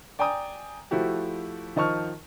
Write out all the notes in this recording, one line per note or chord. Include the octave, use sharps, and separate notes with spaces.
D5 G5 G#5 A#5 D#6
F3 A3 E4 F#4 G4
D#3 F3 D#5 A5 C#6 F6